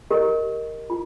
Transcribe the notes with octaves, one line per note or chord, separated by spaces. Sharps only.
G4 A#4 D#5
F4